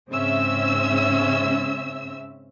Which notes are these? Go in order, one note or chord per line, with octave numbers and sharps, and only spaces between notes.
G#2 C#3 C4 C#4 E5 E6